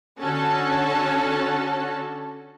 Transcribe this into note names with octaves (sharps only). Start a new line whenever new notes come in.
D3 C#4 F#4 A4 A5